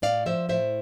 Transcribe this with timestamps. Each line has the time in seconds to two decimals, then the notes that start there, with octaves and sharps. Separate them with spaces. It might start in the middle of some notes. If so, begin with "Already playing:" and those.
0.02 A2 D5 F5
0.26 F3 C5 E5
0.49 A2 C5 E5